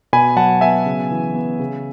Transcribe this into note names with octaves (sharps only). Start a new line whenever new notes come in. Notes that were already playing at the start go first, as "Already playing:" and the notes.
B2 G#5 B5
F#3 F#5 A5
B3 E5 G#5
C#3
E3
B3
C#3